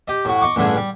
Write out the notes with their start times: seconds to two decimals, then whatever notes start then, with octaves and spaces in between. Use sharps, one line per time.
0.08 G4 D#5
0.25 A2 F#4
0.41 D#5 C#6 D6
0.56 A1 G2 D3 G#4
0.77 G3